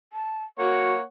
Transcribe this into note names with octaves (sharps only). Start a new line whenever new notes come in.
A5
A#3 F#4 C#5 F#5